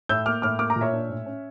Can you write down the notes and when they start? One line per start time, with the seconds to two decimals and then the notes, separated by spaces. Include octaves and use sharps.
0.09 A2 E6 G6
0.26 A#3 D6 F6
0.42 A2 D6 F6
0.59 A#3 D6 F6
0.70 A#5 D6
0.76 A#2
0.81 C#5 E5
0.93 D4
1.09 A2
1.26 C#4